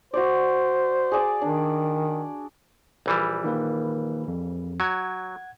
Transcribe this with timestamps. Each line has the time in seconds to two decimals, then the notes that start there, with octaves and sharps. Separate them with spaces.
0.14 F#4 C5 D5
1.12 G#4 D5 A5
1.42 D#3 D4
3.06 A#1 E3 G3
3.44 D#3 A#3 B4
4.28 F2
4.80 F#3 F#5 G#6